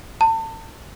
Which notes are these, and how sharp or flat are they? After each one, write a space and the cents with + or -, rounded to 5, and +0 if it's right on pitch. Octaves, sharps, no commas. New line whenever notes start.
A5 +35